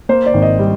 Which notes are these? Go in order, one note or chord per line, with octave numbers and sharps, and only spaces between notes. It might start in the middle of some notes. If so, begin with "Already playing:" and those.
A#3 C5
D5
G#1
D#5
G3